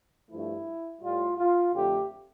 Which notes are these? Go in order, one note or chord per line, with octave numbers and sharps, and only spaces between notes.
G2 F3 A3 E4
A2 G3 F4
F4
F2 D3 A3 G4